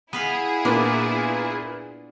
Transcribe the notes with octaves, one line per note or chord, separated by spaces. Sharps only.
B3 E4 G#4 B4 F5
A#2 A#3 B3 D4